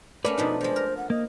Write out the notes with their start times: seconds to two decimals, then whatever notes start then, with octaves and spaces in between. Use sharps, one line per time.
0.25 A3 A#3 C#4 B4 D5
0.38 B2 F3 D4 D#4
0.61 F3 G#3 C5
0.76 A#4
0.97 F#5
1.10 A#3 D#5